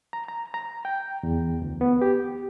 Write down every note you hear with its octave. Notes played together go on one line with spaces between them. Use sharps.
A#5
A#5
A#5
G5
E2
D2
B3
G4